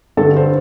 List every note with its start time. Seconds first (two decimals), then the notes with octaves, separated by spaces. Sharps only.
0.17 G2 D3 A4
0.36 C5